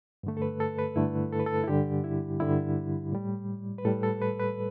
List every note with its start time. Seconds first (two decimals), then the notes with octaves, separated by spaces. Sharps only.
0.23 G2 D3 A3
0.37 A4
0.42 B4
0.60 A4
0.79 B4
0.95 G2 D3 A3 E4
1.33 A4
1.40 B4
1.46 A4
1.64 E4
1.68 G2 D3 G3 G4
2.04 E4
2.40 G2 D3 G3 E4
3.12 A2 G3
3.78 B4
3.85 A2 G3 A4
4.03 A4
4.22 B4
4.40 B4